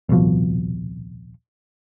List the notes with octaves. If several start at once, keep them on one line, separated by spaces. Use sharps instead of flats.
D#1 C2 B2 F3